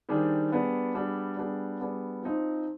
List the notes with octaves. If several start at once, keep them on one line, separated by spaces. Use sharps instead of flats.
D#3 G3 D4 G#4 C5
G3 B3 D4 G#4
G3 B3 D4 G#4
G3 B3 D4 G#4
G3 B3 D4 G#4
F3 C4 D#4